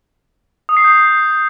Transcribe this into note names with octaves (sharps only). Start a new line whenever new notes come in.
D#6
C7
G6